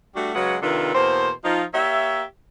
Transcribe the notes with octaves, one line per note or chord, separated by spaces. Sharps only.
G3 A3 D4 F#4
C#3 F#3 G#3 F#4 B4 F#5
C3 D#3 D4 F4 A4 B4
E2 B2 A#3 C5
F3 D#4 F4
A#3 G4 C#5 E5